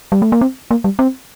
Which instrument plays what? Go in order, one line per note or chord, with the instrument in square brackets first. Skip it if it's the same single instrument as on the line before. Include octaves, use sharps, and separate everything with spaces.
[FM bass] G3
A3
A#3
C4
A#3
G3
C4